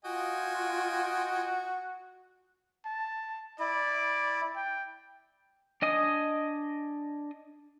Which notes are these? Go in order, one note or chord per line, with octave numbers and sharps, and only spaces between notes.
F4 F#4 D#5 G5 G#5
A5
E4 D5
G5
D4 D#5 G#5 D#6